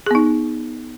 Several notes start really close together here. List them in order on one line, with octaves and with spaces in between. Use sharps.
G#4 B3 D#4